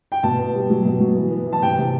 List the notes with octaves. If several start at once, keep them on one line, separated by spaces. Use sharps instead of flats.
G5
B2 A5
B3
G3
F#3
B2
F#3
E3
B3
E3
A5
C3 G5
C3